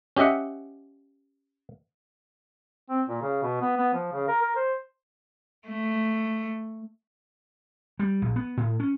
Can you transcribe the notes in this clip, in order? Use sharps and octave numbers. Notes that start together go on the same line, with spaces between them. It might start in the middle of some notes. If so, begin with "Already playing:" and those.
C#4 G4 D#5 E5 F#5
C4
A#2
C#3
B2
B3
B3
F3
C#3
A#4
A#4
C5
A3
G3
A#1
B3
A2
C#4